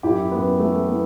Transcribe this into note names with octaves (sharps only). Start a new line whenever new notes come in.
F#2 E4 G4
F#2 B3
E3 A3
E3 B3